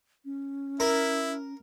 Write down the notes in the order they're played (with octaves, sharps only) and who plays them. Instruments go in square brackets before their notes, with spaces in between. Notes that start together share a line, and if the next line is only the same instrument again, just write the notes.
[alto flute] C#4
[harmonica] E4 [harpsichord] A#4